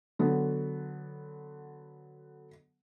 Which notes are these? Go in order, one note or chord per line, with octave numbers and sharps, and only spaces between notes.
D3 F#3 B3